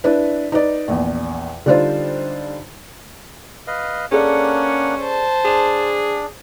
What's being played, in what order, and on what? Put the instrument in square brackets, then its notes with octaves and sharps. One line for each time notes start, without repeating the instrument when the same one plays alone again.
[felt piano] D4 E4 B4
D#4 B4 D5
A#1 E2
D3 G3 D4 D#4 F4 C5
[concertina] B4 D#5 F5
[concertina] A#3 D4 F#5 [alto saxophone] C#4 [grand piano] G#4 A4 D5
[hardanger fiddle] C5 A5
[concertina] D4 [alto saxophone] G#4 [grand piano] E7